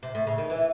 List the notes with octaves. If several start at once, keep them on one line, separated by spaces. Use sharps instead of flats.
C3
A2
C#3
D#3
E3